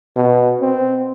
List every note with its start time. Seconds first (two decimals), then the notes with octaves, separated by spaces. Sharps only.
0.16 B2
0.61 C4